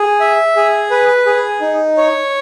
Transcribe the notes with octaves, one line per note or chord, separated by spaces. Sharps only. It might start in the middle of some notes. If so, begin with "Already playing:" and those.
Already playing: G#4
E5
G#4
B4
G#4
D#4
C#5